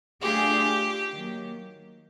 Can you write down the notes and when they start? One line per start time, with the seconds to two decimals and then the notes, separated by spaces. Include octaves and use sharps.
0.21 A3 D4 F4 G4 G#4
1.12 D#3 F#3 A#3